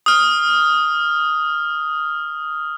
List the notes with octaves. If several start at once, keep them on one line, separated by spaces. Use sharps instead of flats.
D#6 F6